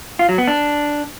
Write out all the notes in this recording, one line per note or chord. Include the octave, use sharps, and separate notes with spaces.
F4
F#3
B3
D4